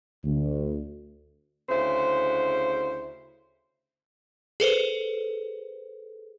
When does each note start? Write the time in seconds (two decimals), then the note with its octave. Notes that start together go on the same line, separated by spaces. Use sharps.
0.24 D2
1.70 D2 C#3 E4 C5
4.60 G#4 A4 B4 C5